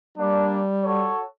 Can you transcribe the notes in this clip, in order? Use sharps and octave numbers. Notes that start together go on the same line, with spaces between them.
G3 A#3 D4
F#4 A4 C#5